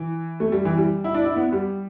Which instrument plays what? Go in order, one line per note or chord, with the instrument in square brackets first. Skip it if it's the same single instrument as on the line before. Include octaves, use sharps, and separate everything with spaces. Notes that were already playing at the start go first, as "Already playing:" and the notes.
Already playing: [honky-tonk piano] E3
A3
G3
E3
G3
E4
D4
E4
B3
G3